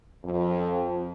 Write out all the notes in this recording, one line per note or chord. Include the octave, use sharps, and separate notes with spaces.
F2